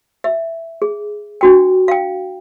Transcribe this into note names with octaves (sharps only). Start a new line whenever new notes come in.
E5
G#4
D4 F#4 G5
F5 G5